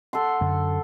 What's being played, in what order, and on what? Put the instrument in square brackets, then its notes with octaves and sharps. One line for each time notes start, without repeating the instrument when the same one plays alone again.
[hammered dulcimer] A4 F#5 C6
[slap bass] F#2 D3